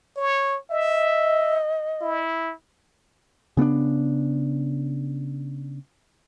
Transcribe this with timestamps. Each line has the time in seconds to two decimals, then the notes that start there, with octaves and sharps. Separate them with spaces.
0.17 C#5
0.71 D#5 E5
2.01 E4
3.57 C#3 B3 C#4 D4